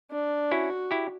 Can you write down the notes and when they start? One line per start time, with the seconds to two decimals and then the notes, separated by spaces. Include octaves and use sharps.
0.11 D4
0.51 C#4 E4 F#4
0.91 E4 G4